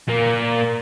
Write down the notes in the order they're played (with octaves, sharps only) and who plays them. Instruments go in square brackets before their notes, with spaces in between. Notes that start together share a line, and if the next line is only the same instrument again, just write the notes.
[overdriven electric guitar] A#2 A#3